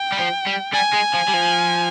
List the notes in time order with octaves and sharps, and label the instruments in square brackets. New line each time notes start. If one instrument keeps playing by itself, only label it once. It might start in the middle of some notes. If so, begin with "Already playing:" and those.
Already playing: [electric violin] G5
[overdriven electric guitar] G3
F3
G3
[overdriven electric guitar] G3 [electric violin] G#5
[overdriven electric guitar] G#3
F3
G3
F3